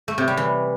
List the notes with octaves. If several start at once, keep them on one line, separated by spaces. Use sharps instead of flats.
A3
C3
G3
E3